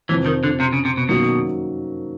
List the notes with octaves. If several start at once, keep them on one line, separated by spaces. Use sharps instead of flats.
F2 C3 E3 F3
D#3
D3
C3
C#3
C3
B2
F#2 B2 D#3 F#3 A#3